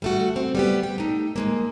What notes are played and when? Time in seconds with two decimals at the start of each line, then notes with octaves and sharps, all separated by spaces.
0.02 G3 A3 F#4
0.36 C4
0.55 G3 B3 G4
0.83 G5
0.98 A3 D#4
1.36 D#2 G#3 A#3